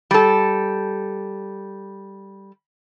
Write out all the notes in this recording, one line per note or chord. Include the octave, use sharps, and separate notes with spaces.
G3 A4